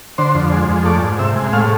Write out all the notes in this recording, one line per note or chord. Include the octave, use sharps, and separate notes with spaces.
D3 C5
F2
G#3
F2
A3 D5
G#2
C3 E5
G#3
A2 F5